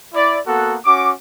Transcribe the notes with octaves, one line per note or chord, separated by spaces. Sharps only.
E4 D5
A#3 B3 F#4 A4 F#5
C#4 F#4 D6